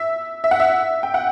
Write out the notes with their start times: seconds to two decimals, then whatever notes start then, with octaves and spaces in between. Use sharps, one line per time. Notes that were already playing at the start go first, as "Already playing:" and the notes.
Already playing: E5
0.44 E5
0.51 F#5
0.60 E5
1.03 G5
1.14 F#5